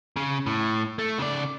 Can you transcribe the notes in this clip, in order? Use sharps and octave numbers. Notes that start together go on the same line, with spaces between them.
C#3
A2
A3
C#3 D5